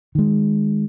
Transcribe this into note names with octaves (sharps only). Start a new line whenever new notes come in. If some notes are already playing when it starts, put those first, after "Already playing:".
D#3 G#3